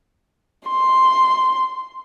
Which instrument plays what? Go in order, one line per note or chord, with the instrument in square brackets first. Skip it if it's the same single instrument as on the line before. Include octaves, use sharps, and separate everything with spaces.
[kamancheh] C6